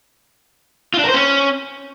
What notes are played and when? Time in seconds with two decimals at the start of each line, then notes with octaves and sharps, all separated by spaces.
0.94 F4
0.99 D4
1.04 A#4
1.09 C5
1.14 C#4